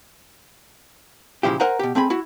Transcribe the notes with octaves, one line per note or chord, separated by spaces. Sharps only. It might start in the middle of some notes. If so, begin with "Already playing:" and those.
A#2 C#3 F3 E4 G4
A#4 C5 F#5 G#5 A#5
B2 G4
A3 C4 G#4 B5
E4 F#4